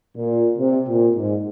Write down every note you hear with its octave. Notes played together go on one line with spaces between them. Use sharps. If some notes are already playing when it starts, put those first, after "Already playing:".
A#2
C3
A#2
G#2